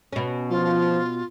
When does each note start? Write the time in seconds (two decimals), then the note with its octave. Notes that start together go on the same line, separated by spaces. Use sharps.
0.13 B2 C#4
0.50 F3 F4